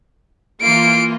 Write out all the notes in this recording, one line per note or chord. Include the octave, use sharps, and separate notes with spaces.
E3 A#3 F4 C7 D7